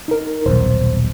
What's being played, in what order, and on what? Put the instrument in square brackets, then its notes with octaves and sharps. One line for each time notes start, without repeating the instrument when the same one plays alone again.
[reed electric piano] D#4 A#4
[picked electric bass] D#1 B1 [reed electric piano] C5